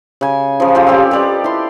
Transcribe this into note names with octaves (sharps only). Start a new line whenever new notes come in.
C#3 G#5
C#3 F3
F3 F4 G4 A4
C4 C#4 G4 D5
G4 B4 D5 D#5
E4 C6